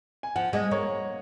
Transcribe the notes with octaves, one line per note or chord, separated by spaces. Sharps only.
G#5
F3 F#5
G#3 D#5
A#3 C#5